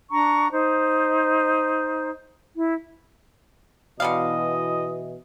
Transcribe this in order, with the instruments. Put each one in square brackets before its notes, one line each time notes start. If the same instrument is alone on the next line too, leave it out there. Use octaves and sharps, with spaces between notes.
[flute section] D4 A#5 C#6
D#4 C5
E4
[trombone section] B2 E3 [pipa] D3 G3 F5 [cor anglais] D#5